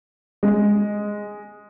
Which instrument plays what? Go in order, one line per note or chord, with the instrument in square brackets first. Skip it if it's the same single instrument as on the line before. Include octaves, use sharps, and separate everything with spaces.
[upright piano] G#3